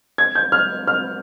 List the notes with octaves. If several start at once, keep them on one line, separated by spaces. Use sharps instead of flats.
G#6
G6
F6
F6